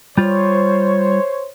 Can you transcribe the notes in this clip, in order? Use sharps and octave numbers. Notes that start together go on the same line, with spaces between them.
G3 F4 C5 C#5